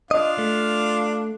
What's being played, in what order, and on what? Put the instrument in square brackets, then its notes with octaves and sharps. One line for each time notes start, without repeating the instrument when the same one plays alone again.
[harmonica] D4 F4 F5 [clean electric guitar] D#5
[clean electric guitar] A3